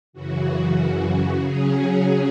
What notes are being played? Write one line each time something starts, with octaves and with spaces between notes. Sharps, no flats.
F#2 C#3 E3 F#4
C#3 F#3 C#4 G#4
G#4
G#4